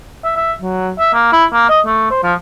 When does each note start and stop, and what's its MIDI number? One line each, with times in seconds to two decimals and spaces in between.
0.24 0.37 76
0.37 0.53 76
0.61 0.92 54
0.99 1.11 76
1.14 1.28 58
1.32 1.45 64
1.53 1.68 58
1.69 1.80 75
1.86 2.08 57
2.11 2.19 72
2.23 2.33 53